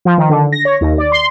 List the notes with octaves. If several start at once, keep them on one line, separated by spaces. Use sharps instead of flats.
F3
D#3
D3
A#6
C#5
D#2
D5
C6